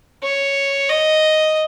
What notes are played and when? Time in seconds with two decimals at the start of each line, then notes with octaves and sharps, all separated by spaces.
0.24 C#5
0.89 D#5